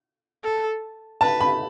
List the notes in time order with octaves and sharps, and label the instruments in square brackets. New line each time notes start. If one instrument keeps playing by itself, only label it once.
[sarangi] A4
[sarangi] B4 [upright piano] A5
[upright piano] B5